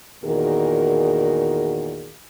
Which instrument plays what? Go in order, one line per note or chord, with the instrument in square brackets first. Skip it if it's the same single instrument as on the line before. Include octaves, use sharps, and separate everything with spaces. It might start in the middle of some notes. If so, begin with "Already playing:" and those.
[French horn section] E2 A#2 D#3 F#4 G#4 A#4